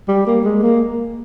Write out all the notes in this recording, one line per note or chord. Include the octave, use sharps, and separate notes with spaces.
G3
A#3
G#3
A#3